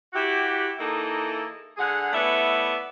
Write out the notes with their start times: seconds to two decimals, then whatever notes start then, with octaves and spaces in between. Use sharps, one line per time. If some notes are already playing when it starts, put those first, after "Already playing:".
0.14 E4 F#4 G4
0.78 E3 A#3 D#4 E4 G#4 A4
1.77 D3 G#4 F#5
2.12 A3 B3 E4 C#5 D5 E5